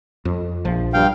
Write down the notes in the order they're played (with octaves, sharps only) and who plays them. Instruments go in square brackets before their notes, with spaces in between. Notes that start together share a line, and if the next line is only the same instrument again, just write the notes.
[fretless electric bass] F2
A#1 F3
[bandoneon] G2 F5 G5